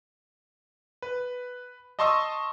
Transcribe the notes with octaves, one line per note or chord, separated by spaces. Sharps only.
B4
D#5 A5 C6 C#6 D#6 E6